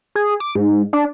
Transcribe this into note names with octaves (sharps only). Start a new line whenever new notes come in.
G#4
D6
G#2
D4